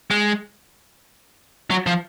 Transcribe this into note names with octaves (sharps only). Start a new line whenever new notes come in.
G#3
F#3
F3